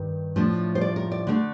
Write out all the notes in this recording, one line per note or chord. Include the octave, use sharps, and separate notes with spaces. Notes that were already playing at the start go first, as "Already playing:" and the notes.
Already playing: G2 D#3
A2 F3 A3 D4
C5
D5
A#4
D5
D3 A3 D4